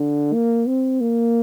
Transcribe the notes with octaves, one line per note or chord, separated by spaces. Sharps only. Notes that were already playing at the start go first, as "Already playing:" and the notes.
Already playing: D3
A#3
C4
A#3